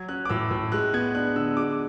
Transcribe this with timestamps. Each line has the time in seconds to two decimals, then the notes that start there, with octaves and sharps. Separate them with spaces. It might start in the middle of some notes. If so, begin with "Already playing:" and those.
Already playing: F#3 G#6
0.08 C#4 F#6
0.25 D6
0.30 A2 E6
0.51 A2
0.72 G#3 F#6
0.94 B3 G#6
1.15 D4 F#6
1.36 D3 E6
1.57 G#3 D6